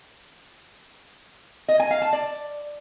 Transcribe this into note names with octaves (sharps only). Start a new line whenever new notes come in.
D#5
G#5
F5
A5
D5